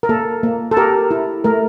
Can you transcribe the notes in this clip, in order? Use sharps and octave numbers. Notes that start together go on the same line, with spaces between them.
A#4
A#3 A4
A#3
A4
G4 A#4
E4
A3 A#4